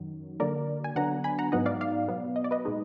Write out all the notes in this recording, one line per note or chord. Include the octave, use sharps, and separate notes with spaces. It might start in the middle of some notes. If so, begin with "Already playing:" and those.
Already playing: F#2 D#3 F#3
D3 F#3 A#3 A#4 D5
G#5
D3 F#3 B3 D4 F#5 A#5
G#5 B5
F#5 A#5
G#2 F#3 B3 D#4 D#5 F#5
D5 F5
D5 F5
B2 F#3 B3
D#5
D5
B4 D#5
A#2 G#3 D#4